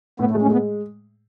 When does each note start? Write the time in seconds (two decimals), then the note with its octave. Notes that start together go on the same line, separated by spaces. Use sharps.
0.19 A2 B3
0.31 A3
0.34 G#3
0.42 C#4
0.49 G#3 B3